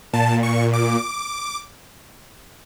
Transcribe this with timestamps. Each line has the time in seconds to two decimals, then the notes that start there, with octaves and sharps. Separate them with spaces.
0.13 A#2 A5
0.43 C#6
0.73 D6